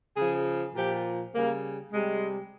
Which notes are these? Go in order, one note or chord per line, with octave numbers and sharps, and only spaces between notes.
C#3 F3 G#4
A#2 F3 G4
C#3 G3 A#3
C3 G3 G#3